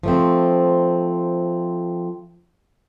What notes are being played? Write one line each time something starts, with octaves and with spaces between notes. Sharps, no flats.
F3 A3 C4